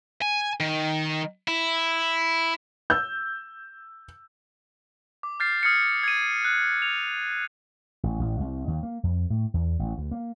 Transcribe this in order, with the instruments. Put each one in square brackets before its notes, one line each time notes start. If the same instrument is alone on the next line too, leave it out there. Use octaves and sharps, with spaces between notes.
[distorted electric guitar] G#5
D#3
E4
[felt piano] E6 G6
[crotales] D6
F6 G6 A6 C7
D#6 F6 G#6 A#6 C#7
G#6 D#7
F#6
F7
[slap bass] A1
A1
C2
D#2
A#3
F2
A2
E2
A1
D2
A#3